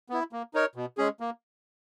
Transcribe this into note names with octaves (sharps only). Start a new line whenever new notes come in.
B3 E4
A#3
D#4 A#4 C#5
B2
G#3 C#4 G#4
A#3